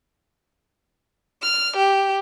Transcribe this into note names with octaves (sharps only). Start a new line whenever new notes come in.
F6
G4